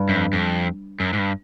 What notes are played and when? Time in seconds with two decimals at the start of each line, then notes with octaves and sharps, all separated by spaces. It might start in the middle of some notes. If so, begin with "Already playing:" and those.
Already playing: G2
0.09 F#2
0.17 F2
0.33 F2
1.00 F#2
1.13 G#2
1.19 G2